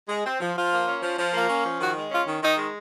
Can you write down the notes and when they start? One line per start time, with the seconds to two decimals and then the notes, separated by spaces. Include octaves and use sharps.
0.09 G#3
0.25 C4
0.40 F3
0.56 F3 F4
0.72 A#3
0.87 C#4
1.03 F3
1.18 F3
1.34 A#3
1.50 C#4
1.65 F3
1.80 D#3 F#4
1.96 G#3
2.11 C#4 F4
2.27 D#3
2.42 D#3 D#4
2.58 G#3